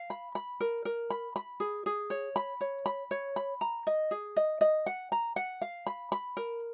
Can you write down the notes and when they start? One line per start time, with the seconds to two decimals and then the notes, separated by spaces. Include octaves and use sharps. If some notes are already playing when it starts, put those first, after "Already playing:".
Already playing: F5
0.10 B5
0.35 B5
0.60 A#4
0.85 A#4
1.10 B5
1.36 B5
1.60 G#4
1.86 G#4
2.10 C#5
2.36 B5
2.61 C#5
2.86 B5
3.11 C#5
3.36 B5
3.61 A#5
3.87 D#5
4.11 G#4
4.36 D#5
4.61 D#5
4.86 F#5
5.12 A#5
5.36 F#5
5.61 F5
5.86 B5
6.12 B5
6.37 A#4